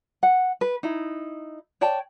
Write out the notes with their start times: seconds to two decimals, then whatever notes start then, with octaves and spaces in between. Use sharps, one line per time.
0.23 F#5
0.61 B4
0.83 D#4 E4
1.81 C#5 D5 G5 A5